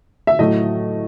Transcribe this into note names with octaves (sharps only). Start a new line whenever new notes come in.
E5
A2 F#3 A3 D#5